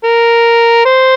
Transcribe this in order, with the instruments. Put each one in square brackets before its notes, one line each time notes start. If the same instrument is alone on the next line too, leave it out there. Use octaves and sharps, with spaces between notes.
[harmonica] A#4
C5